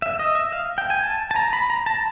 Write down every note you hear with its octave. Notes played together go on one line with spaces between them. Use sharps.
E5
D#5
E5
F5
G5
G#5
A5
A5
A#5
B5
A#5
A5